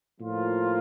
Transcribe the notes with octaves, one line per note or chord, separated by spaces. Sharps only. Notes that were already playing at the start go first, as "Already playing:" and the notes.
A2 F3 A#3 F4